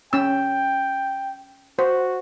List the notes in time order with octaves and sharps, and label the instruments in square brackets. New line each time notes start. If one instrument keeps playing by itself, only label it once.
[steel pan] C#4 E6 [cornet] G5
[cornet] F#4 [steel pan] C5